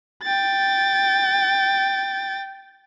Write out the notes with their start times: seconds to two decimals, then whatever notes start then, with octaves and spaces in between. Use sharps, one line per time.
0.23 G5 A6